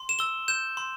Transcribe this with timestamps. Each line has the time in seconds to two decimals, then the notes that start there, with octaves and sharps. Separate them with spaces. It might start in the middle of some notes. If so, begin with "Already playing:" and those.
Already playing: C6
0.09 E7
0.19 E6 G7
0.48 G6 E7
0.77 C6